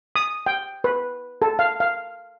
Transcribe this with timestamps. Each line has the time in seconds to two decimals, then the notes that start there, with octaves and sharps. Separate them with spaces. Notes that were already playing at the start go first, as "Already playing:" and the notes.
0.16 D#6
0.46 G5
0.84 B4
1.42 A4
1.59 F5
1.80 F5